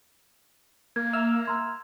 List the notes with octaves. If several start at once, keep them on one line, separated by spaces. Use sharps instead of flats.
A#3 G#6
E5 E6 F6
A#5 C6 G#6